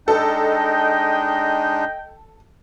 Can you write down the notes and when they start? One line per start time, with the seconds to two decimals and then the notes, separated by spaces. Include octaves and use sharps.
0.08 G#3 D4 D#4 A4 D#5 G5